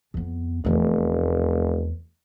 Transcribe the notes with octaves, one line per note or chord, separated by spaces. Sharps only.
F2 B3
F1 E2 A3